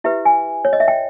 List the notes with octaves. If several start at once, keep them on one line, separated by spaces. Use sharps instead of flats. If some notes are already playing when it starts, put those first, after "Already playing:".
E4 G4 B4 E5
G#5
C#5
D#5
E5
G5